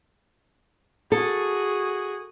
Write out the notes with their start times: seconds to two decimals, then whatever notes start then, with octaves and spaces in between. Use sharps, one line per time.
1.12 F#4 G#4 A4